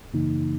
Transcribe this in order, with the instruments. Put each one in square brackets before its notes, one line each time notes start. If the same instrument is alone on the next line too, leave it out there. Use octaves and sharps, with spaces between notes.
[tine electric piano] F#2 C#3 E3 A#3 D#4